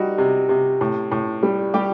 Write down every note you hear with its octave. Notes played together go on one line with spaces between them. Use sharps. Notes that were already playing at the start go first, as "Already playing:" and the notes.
Already playing: G3 D#4 F#4
C3
C3
A2
A2
G3
G3 G4